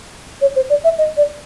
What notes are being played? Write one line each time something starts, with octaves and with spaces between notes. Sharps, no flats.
C#5
C5
D5
E5
D#5
D5